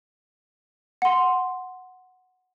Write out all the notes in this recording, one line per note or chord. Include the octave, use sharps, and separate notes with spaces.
F#5 C6